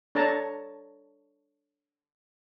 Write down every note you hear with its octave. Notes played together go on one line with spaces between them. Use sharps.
D4 A4 C#5 A5 A#5